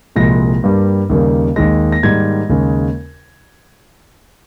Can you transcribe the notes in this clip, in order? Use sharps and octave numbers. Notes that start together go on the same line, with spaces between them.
C2 A#2 F3 G#3 A#6
G2 G3 A#3
D#2 C#3 G3 A#3
D#2 D#3 G#3 A#6
A#6
G#2 D#3 G3 A#3 G#6
D#2 C#3 G#3